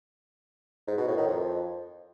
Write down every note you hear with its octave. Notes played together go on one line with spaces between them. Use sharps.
G#2
B2
A2
D#3
F2